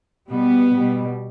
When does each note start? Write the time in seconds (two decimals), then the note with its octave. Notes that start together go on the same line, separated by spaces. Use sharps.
0.29 B2 G3 B3
0.71 B2 G3